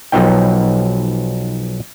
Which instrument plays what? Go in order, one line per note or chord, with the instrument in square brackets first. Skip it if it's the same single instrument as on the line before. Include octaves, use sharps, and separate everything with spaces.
[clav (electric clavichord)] B1 F3 F#3 B3 D#4 G5